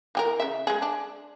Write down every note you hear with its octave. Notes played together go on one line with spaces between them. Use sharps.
E3 G4 A#4
C#3 E5
G#3 G#4
D4